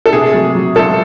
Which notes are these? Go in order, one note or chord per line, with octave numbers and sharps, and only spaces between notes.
A4
C3 G#4
F#3
F#3
C#2 A4